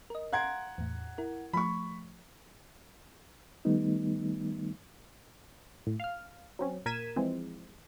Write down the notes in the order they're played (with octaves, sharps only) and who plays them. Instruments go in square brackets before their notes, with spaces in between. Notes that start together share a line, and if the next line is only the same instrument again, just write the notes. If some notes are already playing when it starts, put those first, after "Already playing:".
[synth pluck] A#4 D#5
[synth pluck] F5 C6 D7 [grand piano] F#5 A#5 G#6
[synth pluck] E2 A2
E4 A#4
[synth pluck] F3 A3 [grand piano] B5 C#6
[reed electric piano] D#3 G3 A3 B3 D#4
[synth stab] A2
F5 F6
F#3 C4 C#4
A#2 A#4 G#6 B6 D#7 E7
E3 F3 G#3 C4